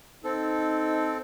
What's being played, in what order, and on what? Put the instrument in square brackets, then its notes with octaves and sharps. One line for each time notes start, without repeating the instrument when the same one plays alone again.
[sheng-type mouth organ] C4 A4 [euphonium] D#4